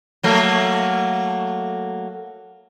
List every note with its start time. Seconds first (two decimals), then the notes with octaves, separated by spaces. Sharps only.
0.23 F#3 A3 A#3